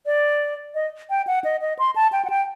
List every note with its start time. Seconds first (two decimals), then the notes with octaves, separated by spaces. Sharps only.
0.06 D5
0.75 D#5
1.10 G5
1.27 F#5
1.44 D#5
1.62 D#5
1.79 C6
1.96 A5
2.12 G5
2.25 F#5
2.30 G5